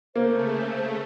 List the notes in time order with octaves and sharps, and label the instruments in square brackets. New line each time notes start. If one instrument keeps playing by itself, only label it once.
[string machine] C#3 A3 [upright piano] A#3 [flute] C5